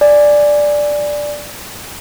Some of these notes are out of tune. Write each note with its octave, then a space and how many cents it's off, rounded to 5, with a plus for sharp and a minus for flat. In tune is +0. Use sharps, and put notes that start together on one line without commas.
D5 +0 G#5 +0